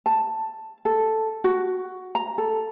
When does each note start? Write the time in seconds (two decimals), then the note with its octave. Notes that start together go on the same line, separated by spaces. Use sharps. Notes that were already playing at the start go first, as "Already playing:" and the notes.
0.06 A5
0.85 A4
1.44 F#4
2.15 A#5
2.38 A4